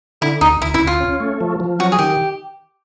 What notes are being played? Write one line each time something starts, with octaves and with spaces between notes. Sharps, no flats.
D3 E4
D2 D#4
D2 E4
E4
D2
F4
C#4
A3
F3
F3
F#3 F#4
G#4
D#3 G4